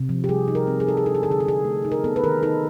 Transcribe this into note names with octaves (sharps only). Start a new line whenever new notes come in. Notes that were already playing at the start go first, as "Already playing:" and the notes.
Already playing: C3
F3
G4
G3 G#4
D#4
A#4
C4
G#4
D#4 A4
G#4
D4 A4
G#4
D3 A4
G#4
A4
D4 G#4
A3
D#4
A#4
B3 A4
B4
D#3 A#4
D#4 A4